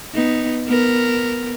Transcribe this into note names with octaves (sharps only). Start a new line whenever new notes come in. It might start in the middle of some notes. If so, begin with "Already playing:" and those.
B3 D#4
B3 A#4